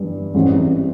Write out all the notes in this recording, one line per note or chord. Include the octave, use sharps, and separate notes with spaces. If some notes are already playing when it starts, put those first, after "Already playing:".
Already playing: G1 G2 E3 G3
A1 G#2 E3 G3 C4